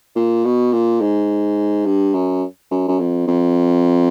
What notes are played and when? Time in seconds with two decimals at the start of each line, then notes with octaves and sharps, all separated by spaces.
0.16 A#2
0.45 B2
0.72 A#2
1.01 G#2
1.85 G2
2.14 F#2
2.71 F#2
2.88 F#2
2.99 F2
3.27 F2